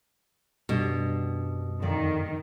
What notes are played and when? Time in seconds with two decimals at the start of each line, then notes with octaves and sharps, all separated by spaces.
0.69 F#2 B2 G3 D4
1.82 F2 A2 D#3 D5